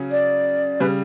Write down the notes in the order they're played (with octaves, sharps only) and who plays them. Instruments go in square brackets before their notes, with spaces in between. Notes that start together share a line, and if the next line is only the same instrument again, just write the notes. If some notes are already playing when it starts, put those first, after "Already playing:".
Already playing: [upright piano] C#3 F#3 C#4
[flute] D5
[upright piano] C#3 G3 [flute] B4